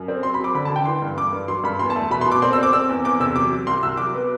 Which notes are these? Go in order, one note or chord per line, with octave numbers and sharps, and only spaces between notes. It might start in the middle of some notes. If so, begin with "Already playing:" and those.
Already playing: F#2
C4
F#3 C6
B5
F#3 D6
D3 B5
A5
D3
G5
E3 C6
G2
G2 D6
G2
F#3 C6
G2 B5
E2 C6
A5
A3
B2 B5
C6
B2
D6
C4 C6
E6
C4 D6
C4 E6
E2
E2 D6
C3 E6
F#3 D6
F#3
C2 C6
C2 E6
F#3 D6
B3